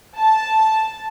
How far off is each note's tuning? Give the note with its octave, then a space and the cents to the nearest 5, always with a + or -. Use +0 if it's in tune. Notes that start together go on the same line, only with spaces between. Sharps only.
A5 -5